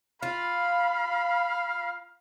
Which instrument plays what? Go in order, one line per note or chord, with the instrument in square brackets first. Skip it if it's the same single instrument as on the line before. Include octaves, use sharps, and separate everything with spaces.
[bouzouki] F4 [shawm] F5 [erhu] B5